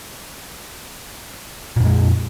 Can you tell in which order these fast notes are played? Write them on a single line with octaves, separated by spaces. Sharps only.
A#2 F2 G#3